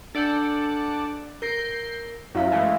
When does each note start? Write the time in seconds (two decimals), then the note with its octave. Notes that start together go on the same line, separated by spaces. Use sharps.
0.15 D4 A4 D5 F#5 G6
1.42 A#4 G6 A#6 C7 D7
2.35 F#2 E4 E5 F5
2.51 E3 G#3 A3